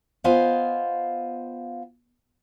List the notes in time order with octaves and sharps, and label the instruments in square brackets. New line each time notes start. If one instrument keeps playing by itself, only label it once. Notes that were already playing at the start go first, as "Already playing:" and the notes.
[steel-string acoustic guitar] B3 F4 C5 D#5 F5 G#5